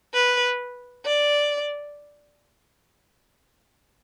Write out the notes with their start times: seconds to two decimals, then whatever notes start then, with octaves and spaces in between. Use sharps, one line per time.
0.14 B4
1.06 D5